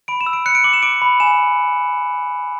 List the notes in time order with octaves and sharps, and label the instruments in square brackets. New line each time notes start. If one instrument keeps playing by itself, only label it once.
[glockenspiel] B5 D7
E7
E6
D7
F#6 C#7
D7
D6 F#7
E7
D6 D7
B5
G#5 E7